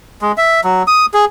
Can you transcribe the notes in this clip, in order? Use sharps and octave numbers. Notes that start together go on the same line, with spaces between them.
G#3
E5
F#3
D#6
G#4